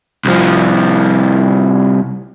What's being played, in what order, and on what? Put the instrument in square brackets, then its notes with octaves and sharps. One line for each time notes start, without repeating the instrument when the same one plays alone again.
[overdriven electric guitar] C2 F3